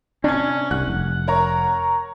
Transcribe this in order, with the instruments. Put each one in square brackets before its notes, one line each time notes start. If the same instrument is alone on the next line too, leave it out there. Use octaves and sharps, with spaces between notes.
[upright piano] C3 G#6 [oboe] C#4 [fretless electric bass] D4
[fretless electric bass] C2 [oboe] F#5 [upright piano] F#6
[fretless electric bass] F1
[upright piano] A#4 C#5 A#5